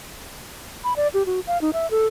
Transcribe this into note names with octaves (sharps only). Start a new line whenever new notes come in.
B5
D5
G4
F#4
F5
D#4
E5
A4